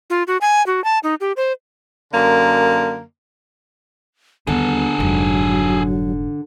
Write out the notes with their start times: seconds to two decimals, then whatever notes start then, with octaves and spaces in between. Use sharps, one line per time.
0.10 F4
0.27 F#4
0.41 G#5
0.66 F#4
0.84 A5
1.03 D#4
1.21 G4
1.37 C5
2.13 F#2 D3 A#3
4.47 D#2 D3 G3 B3 G#4 A4
5.00 F1 G#2 F#3